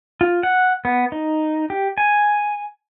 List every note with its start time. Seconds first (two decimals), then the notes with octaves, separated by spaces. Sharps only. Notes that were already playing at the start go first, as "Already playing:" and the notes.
0.21 F4
0.43 F#5
0.85 B3
1.12 D#4
1.70 G4
1.98 G#5